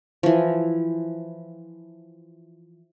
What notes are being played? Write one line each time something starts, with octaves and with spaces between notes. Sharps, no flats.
E3 F3